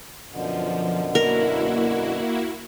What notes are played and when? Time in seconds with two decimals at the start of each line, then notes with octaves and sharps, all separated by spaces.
0.31 F#2 B2 D3 F3
1.15 A#3 E4 F#4 A#4